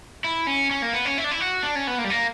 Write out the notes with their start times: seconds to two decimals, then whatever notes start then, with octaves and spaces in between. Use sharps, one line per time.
0.24 E4
0.47 C#4
0.71 C#4
0.82 A#3
0.93 B3
1.05 C#4
1.18 E4
1.24 D4
1.31 E4
1.41 F#4
1.63 D4
1.75 C#4
1.87 B3
1.98 A#3
2.04 G3
2.10 A#3